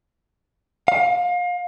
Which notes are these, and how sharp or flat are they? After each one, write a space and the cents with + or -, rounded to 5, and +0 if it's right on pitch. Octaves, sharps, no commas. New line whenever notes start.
F5 +30